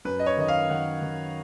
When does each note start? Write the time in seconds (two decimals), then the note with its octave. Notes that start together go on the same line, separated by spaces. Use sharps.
0.05 F#2 B4
0.19 D#5
0.26 C#5
0.37 D#3 D#5
0.48 F5
0.69 D#3 F#5
1.02 D#3